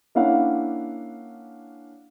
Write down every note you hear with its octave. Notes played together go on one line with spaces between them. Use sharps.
A#3 C#4 D4 E4 F5 F#5